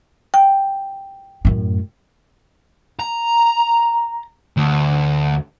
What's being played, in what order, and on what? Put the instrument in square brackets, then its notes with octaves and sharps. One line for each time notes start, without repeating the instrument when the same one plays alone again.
[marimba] G5
[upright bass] F#2 A2
[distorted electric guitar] A#5
D2